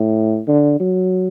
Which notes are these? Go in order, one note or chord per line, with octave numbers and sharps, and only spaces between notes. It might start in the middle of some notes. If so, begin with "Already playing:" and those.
Already playing: A2
D3
F#3